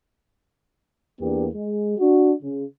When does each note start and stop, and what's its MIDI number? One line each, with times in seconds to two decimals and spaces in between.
1.20 1.47 40
1.20 1.47 58
1.20 1.47 59
1.20 1.47 62
1.20 1.47 67
1.55 1.96 56
1.99 2.32 62
1.99 2.32 66
2.43 2.65 49